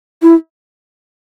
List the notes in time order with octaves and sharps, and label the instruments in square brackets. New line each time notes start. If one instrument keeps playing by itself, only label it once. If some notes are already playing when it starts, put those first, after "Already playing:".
[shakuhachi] E4